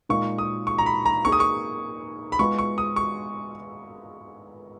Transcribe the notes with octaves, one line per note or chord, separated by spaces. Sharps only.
A#2 G#3 D#4 A#4 F5 C#6
D#6
C#6
A#5
B5
A#5
A#3 D#4 G#4 C#6
D#6
C#6
B5
G#3 B3 F4 C#6
C#6
D#6
C#6